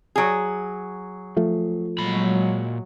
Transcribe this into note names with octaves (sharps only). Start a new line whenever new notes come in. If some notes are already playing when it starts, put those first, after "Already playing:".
F#3 G#4
F3 A3
A#2 F#3 G#3 B5